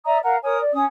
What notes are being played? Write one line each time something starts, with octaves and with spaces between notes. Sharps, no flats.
D5 E5 A#5 D#6
A#4 F5 F#5 A#5
A#4 C#5 G#5 D#6
D5
C#4 D#6